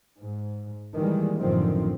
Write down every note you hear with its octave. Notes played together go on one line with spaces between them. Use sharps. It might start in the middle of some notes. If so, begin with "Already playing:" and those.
G#2
D#3 E3 G3 G#3 A#3
A1 F#2 D3 D#3 F3 C4